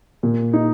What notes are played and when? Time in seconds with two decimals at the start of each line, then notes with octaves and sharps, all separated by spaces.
0.23 A#2
0.53 D#4